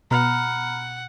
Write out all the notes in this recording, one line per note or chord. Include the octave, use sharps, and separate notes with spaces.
B2 F#5 A#5 B5 F6